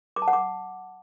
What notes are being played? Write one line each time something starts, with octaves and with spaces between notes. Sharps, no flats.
D6
A5
F#5
D6